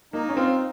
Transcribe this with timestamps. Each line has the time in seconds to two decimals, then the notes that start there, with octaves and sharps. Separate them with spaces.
0.13 A#3 D#4
0.29 C#4
0.36 C4 F4